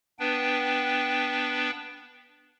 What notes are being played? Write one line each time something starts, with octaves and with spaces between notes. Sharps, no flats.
B3 D4 B4 G5